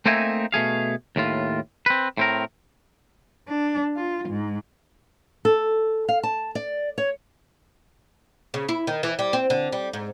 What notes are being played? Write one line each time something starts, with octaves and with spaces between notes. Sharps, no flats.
A3 A#3 C4 D#4 E5 G#5
B2 A3 G#4 F5
D#2 A2 F4
C4 B4
A2 C4 A#4
D4
F4
G#2
A4
F5
A5
D5
C#5
C#3
E4
D#3
E3
G3
C4
D3
G3
G#2